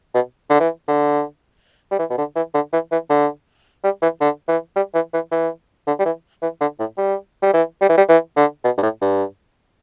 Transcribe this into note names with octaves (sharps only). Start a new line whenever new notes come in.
B2
D3
E3
D3
G3
E3
B2
D3
E3
D3
E3
E3
D3
G3
E3
D3
E3
G3
E3
E3
E3
D3
G3
E3
E3
D3
A2
G3
G3
E3
G3
E3
G3
E3
D3
B2
G2
A2
G2